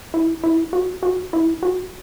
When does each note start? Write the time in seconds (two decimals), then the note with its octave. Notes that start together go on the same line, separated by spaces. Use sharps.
0.14 E4
0.44 E4
0.73 F#4
1.03 F#4
1.33 E4
1.63 F#4